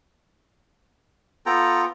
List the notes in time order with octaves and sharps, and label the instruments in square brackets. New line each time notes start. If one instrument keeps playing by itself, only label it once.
[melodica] B3 F4 [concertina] A4 G5 A#5